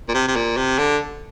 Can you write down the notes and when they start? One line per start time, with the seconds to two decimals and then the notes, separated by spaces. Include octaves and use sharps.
0.09 A#2
0.14 C3
0.28 C3
0.36 A#2
0.57 C3
0.78 D3